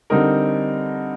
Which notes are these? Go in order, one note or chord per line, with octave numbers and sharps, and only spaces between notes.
D3 G3 C4 D#4 A#4